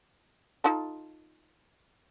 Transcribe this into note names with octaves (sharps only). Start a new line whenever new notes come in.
D#4 F4 A4